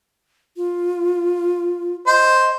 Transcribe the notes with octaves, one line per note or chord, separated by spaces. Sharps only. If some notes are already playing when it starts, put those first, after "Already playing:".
F4
C5 D#5